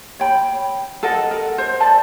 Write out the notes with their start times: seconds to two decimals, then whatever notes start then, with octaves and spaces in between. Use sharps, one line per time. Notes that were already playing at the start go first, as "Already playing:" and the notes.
0.19 C#5 G5 B5
1.03 A4 A#4 D#5 F#5
1.31 A#4
1.58 C5
1.80 A4 D5 E5 A5